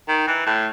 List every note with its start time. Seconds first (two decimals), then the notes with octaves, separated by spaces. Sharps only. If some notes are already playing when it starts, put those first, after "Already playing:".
0.08 D#3
0.27 E3
0.46 A2